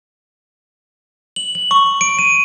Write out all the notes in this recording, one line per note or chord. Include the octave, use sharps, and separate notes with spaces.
F#7
F#7
C#6
D7
D#7